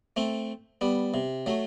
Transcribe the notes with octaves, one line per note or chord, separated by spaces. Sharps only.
A3 C4
G3 B3
C3
F#3 A3